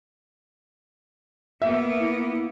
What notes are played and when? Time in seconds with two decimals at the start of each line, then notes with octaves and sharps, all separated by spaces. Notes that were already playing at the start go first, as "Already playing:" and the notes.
1.62 A#3 B3 E5
2.00 E4